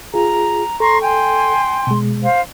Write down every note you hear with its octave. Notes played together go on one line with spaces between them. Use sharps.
F4 G#4 A#5
A4 A#5 C6 C#6
G5 G#5 C6
B2 G#3
C5 F5